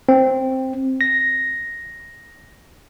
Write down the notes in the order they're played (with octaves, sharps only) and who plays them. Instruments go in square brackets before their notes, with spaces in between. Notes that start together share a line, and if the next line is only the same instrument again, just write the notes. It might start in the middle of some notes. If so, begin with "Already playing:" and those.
[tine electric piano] C4
A#6